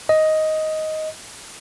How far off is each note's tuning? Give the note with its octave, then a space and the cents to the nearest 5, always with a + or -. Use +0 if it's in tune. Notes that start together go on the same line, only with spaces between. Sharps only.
D#5 +10